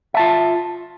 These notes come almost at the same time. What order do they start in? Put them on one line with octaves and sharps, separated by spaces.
E5 A5 F4